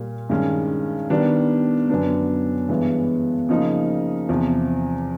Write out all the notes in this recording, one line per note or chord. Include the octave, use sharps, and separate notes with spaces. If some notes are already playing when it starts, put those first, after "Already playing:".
Already playing: A#2 G3 A#3
G2 D#3 G#3 C#4
D#3 G3 B3 D4
F#2 D3 F#3 B3 D4
G2 E3 G#3 B3
C#3 F3 A#3 D#4
E2 C3 F3